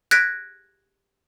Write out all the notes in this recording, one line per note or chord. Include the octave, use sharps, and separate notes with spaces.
F#6 G#6 A#6 B6 D7